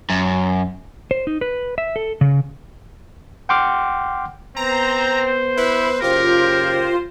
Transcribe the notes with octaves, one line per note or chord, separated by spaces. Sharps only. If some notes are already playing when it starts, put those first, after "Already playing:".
F#2
C5
D#4
B4
E5
A4
C#3
F#5 G5 C6 D6 F6
B3 C4 C5 A#5
E4 B4
F#1 C#3 F4 G4 A#4 C5